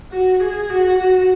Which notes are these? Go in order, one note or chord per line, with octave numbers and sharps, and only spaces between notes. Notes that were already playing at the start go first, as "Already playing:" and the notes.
F#4
G#4
F#4
F#4